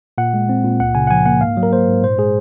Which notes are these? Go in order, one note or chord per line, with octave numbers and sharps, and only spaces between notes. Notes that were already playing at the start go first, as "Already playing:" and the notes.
A#2 F#5
G#3
C4
A#2
C#2 F#5
C#3 G#5
F#5
F3 G#5
A#3 F#5
G#2 F5
F#3
A#4
A#3 C5
G#2
A#2 C5
G#3 G#4